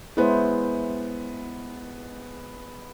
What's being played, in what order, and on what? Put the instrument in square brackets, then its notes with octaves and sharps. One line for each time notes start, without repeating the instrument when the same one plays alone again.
[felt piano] G#3 B3 [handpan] E4 C5 C#5